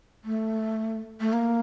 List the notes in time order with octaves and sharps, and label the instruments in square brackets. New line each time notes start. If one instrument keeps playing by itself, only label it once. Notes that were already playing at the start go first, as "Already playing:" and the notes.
[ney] A3
A3
A#3